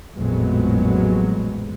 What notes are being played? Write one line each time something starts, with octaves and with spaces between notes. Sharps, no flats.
A1 F2 A#2 F#3 G#3 B3